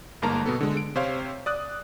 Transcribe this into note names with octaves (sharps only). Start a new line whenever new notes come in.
G1 G#2 A#3 A#4 A5 A#5
B2 B3 A4
D3 G#3
D7
C3 C5 C#5 F5
D5 D#6 F#6